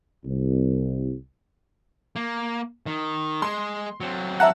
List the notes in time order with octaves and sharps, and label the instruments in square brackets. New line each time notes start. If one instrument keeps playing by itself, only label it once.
[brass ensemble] C2
[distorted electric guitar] A#3
D#3
[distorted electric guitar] G#3 G#4 [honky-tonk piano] C6
[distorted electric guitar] F#3 C4
[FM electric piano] E5 A#5 F#6 [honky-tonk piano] F#5 A5 E6